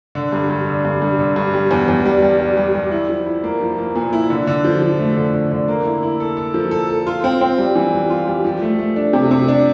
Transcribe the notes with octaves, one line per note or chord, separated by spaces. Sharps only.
D3
G2
G2
D3
G2
G2
D3
G2
G3
E2
E2
G3
G3
G3
G3
G3
E4
F3
E4
A#3
F3
A#3
A#2
E4
D3
D3
F3
F3
A3
D3
D3
D3
A#3
E4
E4
A4
A4
F3
A4
A4
F4
C4
C4
G3
E3
G3
F4
G3
F3
A3
A3
D4
C3
C3
D4